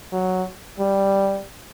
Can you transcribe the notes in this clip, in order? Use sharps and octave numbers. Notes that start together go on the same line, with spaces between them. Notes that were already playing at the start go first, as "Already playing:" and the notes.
F#3
G3